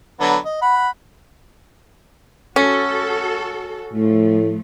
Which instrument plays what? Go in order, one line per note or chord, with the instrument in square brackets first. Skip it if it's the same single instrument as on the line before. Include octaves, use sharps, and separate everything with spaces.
[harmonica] D3 F#3 B3
D#5
F#5 B5
[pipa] C#4 [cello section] F#4 A4
[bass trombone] A2 [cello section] F3 A3